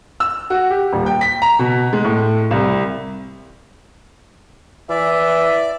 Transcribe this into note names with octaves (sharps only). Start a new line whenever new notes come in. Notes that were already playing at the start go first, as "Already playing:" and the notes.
E6
F#4
G4
D#1
G5
B6
A#5
B2
G#3
A2
C2
E3 D5 E5